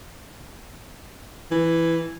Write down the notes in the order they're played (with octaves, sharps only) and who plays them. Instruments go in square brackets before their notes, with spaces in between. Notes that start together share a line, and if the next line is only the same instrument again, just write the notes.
[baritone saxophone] E3